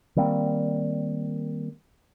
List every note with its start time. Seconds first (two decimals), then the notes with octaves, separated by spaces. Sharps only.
0.16 D#3 G3 A#3 C4